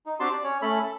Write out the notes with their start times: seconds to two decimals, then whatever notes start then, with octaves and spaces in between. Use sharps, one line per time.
0.06 D#4
0.20 C4 D4 F#4 G4 A5 C6
0.32 D5
0.44 C#4 C#5
0.62 A3 C#4 A4 B5
0.83 A4